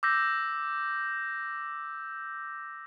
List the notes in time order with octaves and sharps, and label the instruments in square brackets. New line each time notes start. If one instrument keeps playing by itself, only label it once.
[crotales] D6 E6 G6 A#6